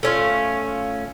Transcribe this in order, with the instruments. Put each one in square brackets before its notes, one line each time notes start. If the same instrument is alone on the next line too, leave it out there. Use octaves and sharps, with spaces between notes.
[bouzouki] A3 C#4 F4